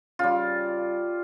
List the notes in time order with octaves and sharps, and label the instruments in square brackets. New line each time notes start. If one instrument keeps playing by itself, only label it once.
[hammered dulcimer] C#3 G3 F4